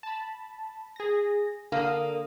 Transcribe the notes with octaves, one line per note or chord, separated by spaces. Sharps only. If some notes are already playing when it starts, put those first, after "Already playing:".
A5 B5
G#4 A#6
D3 A#3 F5 D#6